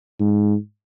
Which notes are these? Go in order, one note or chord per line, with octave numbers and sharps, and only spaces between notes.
G#2